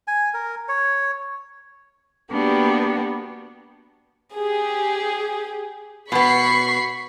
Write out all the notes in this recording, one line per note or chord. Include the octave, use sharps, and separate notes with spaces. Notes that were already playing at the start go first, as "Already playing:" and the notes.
G#5
A#4
C#5
A#3 B3 D4 F#4 G4
G4 G#4
B2 B3 B5 C#6 C7